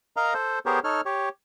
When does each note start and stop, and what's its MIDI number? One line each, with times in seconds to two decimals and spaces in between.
0.17 0.34 70
0.17 0.34 75
0.17 0.34 77
0.17 0.34 82
0.34 0.59 69
0.34 0.59 72
0.66 0.79 59
0.66 0.79 67
0.66 0.79 68
0.66 0.79 70
0.66 0.79 72
0.66 0.79 73
0.84 1.01 63
0.84 1.01 69
0.84 1.01 73
0.84 1.01 89
1.06 1.29 67
1.06 1.29 73